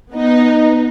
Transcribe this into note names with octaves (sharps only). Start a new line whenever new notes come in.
B3 D#4